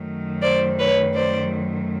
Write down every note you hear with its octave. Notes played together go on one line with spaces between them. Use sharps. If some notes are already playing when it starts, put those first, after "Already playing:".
Already playing: F#2 D#3 F#3 A3
C5 D5
B4 C#5
C5 D5